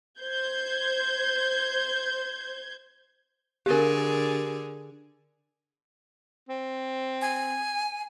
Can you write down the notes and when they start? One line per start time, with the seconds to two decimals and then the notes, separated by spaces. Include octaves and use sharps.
0.20 C5 G6 G#6
3.66 D3 G4 G#4 A#4
6.49 C4
7.22 G#5